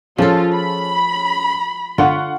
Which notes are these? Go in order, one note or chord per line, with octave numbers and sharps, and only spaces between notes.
F3 C#4 F4 G#4 A4
B5
D3 F4 F#5 C#6